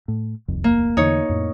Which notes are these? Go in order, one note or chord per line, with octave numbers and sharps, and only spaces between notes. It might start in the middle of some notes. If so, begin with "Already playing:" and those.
A2
D#1 C2 F2
A#3
E2 D3 D#4 C#5
F2 A2